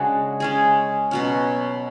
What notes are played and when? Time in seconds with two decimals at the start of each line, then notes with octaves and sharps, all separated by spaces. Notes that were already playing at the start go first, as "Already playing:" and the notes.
Already playing: C#3 G#3 D4 F#4
0.40 G#3 C#4 G#4
1.11 B2 F#3 C#4